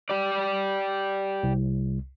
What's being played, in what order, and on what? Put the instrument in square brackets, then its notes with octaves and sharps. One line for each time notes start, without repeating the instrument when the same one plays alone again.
[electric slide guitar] G4 D5
[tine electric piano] C2